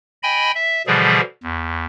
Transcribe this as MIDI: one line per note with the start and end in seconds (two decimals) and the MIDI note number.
0.23 0.52 75
0.23 0.52 79
0.23 0.52 80
0.23 0.52 83
0.55 0.82 76
0.87 1.21 47
0.87 1.21 50
0.87 1.21 52
0.87 1.21 53
0.87 1.21 55
0.87 1.21 68
1.43 1.86 40